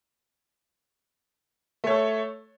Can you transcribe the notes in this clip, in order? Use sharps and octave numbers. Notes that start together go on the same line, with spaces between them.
A3 A4 C#5